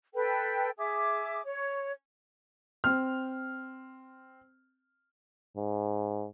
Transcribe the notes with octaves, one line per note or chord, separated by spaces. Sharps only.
A4 B4 G5
G#4 E5 D6
C#5
C4 F6
G#2